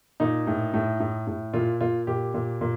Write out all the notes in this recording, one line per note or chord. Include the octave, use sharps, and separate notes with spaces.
A#2 D#4
A2
A2
A2
A2
A#2 F4
A#2 F4
A#2 G4
A#2
A#2